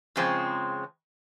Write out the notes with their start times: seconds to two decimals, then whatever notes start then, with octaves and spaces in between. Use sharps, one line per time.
0.16 F2 C#3 F3 G#3 C4